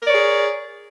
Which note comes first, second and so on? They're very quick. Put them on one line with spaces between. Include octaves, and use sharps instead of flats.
A#4 D5 C#5 G#4